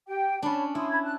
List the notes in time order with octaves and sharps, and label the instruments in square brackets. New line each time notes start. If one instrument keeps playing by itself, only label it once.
[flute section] G4 G5
[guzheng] C#4 D4 [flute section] C#5 A5 B5
[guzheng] E4 [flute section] C6 D#6
[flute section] B5 G#6
A5 F#6